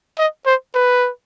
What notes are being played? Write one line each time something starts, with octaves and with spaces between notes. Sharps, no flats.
D#5
C5
B4